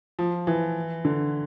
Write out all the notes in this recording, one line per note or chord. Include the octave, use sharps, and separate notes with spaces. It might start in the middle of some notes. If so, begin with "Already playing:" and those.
F3
E3
D3